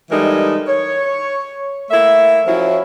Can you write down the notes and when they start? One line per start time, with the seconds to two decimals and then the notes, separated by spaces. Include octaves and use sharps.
0.10 E3 G3 G#3 D#4 A4 A#4
0.68 C#5
1.91 A3 A#3 E4 E5
2.46 F3 F#3 C#4 E4